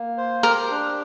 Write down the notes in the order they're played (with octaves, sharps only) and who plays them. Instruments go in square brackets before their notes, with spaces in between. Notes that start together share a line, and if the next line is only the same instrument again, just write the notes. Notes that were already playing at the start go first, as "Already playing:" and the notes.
Already playing: [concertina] A#3
C5
[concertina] G4 [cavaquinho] A#4
[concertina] D4